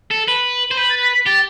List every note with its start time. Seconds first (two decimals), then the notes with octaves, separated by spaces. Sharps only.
0.11 A4
0.28 B4
0.71 C5
0.77 B4 G6
0.90 A6
1.02 B6
1.15 B6
1.27 G4 A6